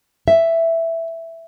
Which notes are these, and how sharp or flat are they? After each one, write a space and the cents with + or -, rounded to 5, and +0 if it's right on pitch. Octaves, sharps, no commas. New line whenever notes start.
E5 +5